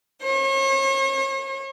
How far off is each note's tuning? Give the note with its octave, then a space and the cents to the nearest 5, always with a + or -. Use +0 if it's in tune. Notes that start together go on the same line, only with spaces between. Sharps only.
C#5 -40